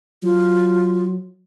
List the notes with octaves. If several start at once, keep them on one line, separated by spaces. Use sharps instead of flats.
F#3 F4